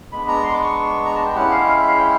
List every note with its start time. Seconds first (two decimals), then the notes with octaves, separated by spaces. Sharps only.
0.12 G#3 B3 D4 B5
0.28 A#5
0.43 C6
0.54 D6
0.64 C#6
1.05 A#5
1.16 A5
1.26 G5
1.35 G#3 C#4 E4 G4 F#5
1.51 F5
1.66 F5
1.77 E5
1.87 F5
1.97 G5